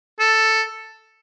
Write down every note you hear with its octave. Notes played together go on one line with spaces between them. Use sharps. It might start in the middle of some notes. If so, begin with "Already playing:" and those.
A4